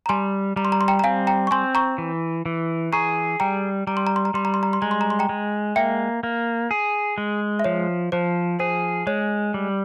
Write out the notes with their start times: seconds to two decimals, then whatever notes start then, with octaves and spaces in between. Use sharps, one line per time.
0.06 A#5
0.09 G3 G#5 C6
0.56 G3 A#5
0.65 C6
0.72 A#5
0.81 C6
0.88 G5 A#5
0.99 A#5
1.04 C4 F5 G#5
1.27 G5 A#5
1.47 C#6
1.51 C4 G#5 C6
1.75 A#5 C#6
1.98 E3
2.46 E3
2.93 G#4 A#5 C#6
3.40 G3 G5 A#5
3.87 G3 A#5
3.97 C6
4.07 A#5
4.16 C6
4.25 A#5
4.34 G3 C6
4.45 A#5
4.54 C6
4.63 A#5
4.73 C6
4.82 G#3 A#5
4.91 C6
5.01 A#5
5.10 C6
5.19 G5 A#5
5.29 G#3
5.76 A#3 E5 G5
6.23 A#3
6.71 G#4
7.18 G#3
7.59 E5
7.64 F3 C#5
8.12 F3 C5
8.59 G#4 C5
9.07 G#3 C#5
9.54 G3